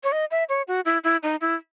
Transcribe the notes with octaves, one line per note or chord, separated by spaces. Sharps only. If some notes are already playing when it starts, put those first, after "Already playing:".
C#5
D#5
E5
C#5
F#4
E4
E4
D#4
E4